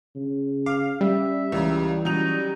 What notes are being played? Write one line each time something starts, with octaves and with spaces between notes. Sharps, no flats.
C#3
F5 D6
G3 C#4 E5
C#2 C#3 E3 A#5
F#3 C#4 D#4 F7